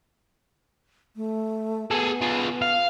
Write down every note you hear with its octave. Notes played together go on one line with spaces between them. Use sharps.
A3
B3 G#4 A4
F4 G#4
F5